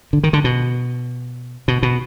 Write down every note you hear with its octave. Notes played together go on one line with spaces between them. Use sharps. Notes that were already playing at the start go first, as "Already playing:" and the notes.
D3
D#3
D3
B2
B2
B2